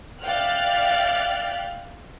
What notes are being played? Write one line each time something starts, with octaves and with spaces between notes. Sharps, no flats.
D5 E5 F5 G5 F6 F#6